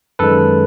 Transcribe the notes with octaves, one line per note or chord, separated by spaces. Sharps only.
F#2 D#3 G#3 A4 B4